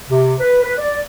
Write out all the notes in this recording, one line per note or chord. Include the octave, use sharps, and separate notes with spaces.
C3
B4
B4
D5